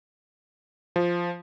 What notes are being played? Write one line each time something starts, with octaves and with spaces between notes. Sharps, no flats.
F3